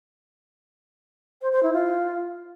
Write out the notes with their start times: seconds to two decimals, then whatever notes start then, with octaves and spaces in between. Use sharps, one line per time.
1.42 C5
1.52 C5
1.63 E4
1.73 F4